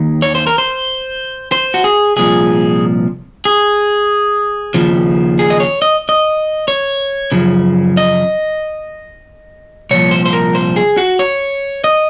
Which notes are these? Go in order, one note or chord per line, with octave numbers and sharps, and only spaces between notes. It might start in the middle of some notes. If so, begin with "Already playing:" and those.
Already playing: D#2 D#3
C#5
C5
A#4
C5
C5
F#4
G#4
C2 A#2 F3 G#4
G#4
D#2 C#3 F3
G#4
D#5
C#5
D#5
D#5
C#5
F#2 C#3 F3
D#5
C2 A#2 F3 C#5
C5
C5
A#4
C5
G#4
F#4
C#5
D#5